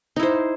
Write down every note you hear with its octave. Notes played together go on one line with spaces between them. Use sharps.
D#4 E4 C5